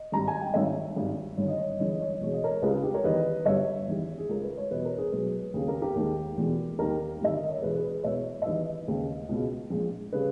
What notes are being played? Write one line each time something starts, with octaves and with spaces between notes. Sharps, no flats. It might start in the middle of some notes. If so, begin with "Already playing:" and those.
Already playing: D#5
G#1 G2 G3 A#5
G#5
G5
G#1 G2 D#3 C#5 E5
G#1 G2 D#3 G3
G1 G2 D#3 C#5
D#5
C#5
D#5
G1 G2 E3 G#3 C#5
D#5
C#5
D#5
E2 B2 G#3 C#5
D#5
A#4 C#5
C#2 C#3 G3 G#4 B4
G#4
G4
A#4 C#5
E2 D#3 G3 B4 D#5
G1 G2 G3 C#5 E5
E2 D#3 G3
G#4
C#2 C#3 G#3 A#4
B4
C#5
E2 B2 G3 B4 D#5
A#4 C#5
G#4 B4
B1 B2 G#3 G#4 B4
D#2 C#3 G3 G#4
G4 A#4
G4 A#4
D#2 D#3 G#3
E2 B2 G#3
D#2 D#3 G3 G4 A#4
G1 G2 D#3 G3 E5
D#5
C#5
E2 B2 G#3 G#4 B4
G#4 B4
G#4 B4
E1 E2 B2 G#3 C#5 E5
E5
E2 D#3 G3 B4 D#5
D#2 C#3 G#3
C#2 B2 G#3
A#1 A#2 G#3
C#3 G3 G#4 B4